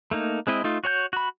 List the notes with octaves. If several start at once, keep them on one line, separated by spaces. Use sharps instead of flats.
A3 A#3 D#4
G#3 C4 E4 D#5
A3 D#4 F4
F#4 C#5 G5 G6
F#4 B5